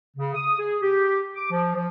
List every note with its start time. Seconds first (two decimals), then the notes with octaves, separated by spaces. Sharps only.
0.17 C#3
0.35 D#6
0.59 G#4
0.82 G4
1.35 D6
1.51 F3
1.75 F3